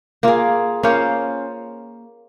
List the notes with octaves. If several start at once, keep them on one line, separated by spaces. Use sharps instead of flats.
A#3 F4 G#4
A#3 C#4 F4 C5